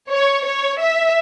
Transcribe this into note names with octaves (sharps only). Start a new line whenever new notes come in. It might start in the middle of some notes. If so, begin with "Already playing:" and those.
C#5
C#5
E5